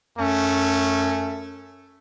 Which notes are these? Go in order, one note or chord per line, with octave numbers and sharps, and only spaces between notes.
F#2 A3 C#4